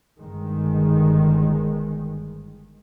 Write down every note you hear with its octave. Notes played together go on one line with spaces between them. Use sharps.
G1 D#3 G#3